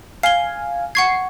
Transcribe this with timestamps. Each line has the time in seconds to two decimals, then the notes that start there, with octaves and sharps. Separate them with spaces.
0.23 F5 G#5 C7 G7
0.95 F#5 C#6 G#6 C7